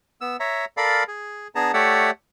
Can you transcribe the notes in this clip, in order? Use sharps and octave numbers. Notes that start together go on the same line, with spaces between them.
B3 E6
C#5 E5 A#5
A4 A#4 D5 F5 B5
G#4
B3 D4 G#4 A5 A#5
A3 G4 C#5 D5 E5 F#5